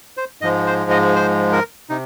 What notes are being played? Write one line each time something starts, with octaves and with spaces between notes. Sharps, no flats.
C5
G#2 F3 G#3 D#5
C5
D#5
C5
A#4
C3 D#4